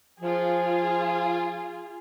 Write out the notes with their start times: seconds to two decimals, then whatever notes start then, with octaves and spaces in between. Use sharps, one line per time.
0.20 F3 F4 G#4